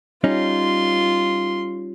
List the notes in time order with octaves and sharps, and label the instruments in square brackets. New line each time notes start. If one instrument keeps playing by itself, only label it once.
[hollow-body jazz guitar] G3 C#4 D#4 [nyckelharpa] F4 C6